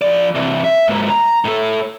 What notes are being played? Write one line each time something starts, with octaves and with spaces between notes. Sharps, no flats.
F3 D5
C3 E3
E5
G#2 A#3
A#5
A2 A4